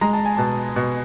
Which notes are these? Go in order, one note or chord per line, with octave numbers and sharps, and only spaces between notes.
G#3 A#5
A5
G#5
B2 A5
B2